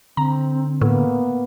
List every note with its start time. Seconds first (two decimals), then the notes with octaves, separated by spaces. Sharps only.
0.17 D3 C4 A#5
0.81 A2 A#3 B3